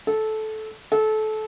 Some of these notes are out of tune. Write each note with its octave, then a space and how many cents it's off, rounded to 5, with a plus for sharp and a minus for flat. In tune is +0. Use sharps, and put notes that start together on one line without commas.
A4 -15
A4 -25